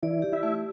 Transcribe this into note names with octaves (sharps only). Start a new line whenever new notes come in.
E3 E4 D5
G4
E4 E5
A3